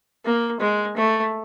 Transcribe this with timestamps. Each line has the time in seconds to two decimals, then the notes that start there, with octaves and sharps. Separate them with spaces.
0.25 A#3
0.60 G#3
0.96 A3